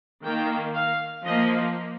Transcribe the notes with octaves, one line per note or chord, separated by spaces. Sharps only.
D#3 A#3 G5
F5
F3 A#3 D#5